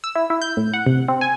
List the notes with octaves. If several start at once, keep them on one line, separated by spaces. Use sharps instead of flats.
E6
E4
E4
G6
A2
F#5
C3
C4
G#5